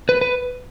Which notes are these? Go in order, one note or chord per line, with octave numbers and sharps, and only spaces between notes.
B4
B4